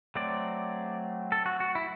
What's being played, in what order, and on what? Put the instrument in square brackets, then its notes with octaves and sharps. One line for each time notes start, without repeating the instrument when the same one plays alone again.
[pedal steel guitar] F#3 A3 C4 D5
A4
F#4
F#4
E4